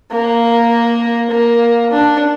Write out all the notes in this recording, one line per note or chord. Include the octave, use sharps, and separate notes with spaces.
A#3
A#3
D4